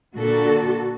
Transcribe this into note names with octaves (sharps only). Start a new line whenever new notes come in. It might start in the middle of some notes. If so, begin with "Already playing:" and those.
A#2 D3 F#4 A4